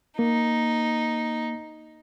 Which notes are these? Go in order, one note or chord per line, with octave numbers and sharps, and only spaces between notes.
A#3 D#4